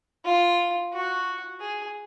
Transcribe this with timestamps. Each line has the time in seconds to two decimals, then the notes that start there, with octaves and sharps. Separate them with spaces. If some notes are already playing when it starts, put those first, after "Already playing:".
0.24 F4
0.93 F#4
1.60 G#4